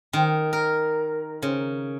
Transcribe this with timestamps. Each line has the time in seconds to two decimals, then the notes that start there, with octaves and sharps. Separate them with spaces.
0.13 D#3
0.53 A#4
1.42 C#3